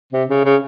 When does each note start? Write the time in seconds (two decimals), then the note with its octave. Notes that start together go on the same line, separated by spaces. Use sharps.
0.13 C3
0.29 C#3
0.45 C#3